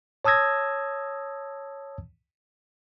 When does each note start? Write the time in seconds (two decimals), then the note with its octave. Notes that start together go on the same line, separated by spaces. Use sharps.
0.25 C#5 A5 D#6 E6 G#6 A#6